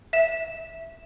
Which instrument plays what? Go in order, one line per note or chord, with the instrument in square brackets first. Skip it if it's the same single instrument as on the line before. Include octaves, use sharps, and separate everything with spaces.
[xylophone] E5 E7